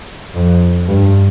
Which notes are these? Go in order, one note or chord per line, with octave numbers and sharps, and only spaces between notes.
F2
G2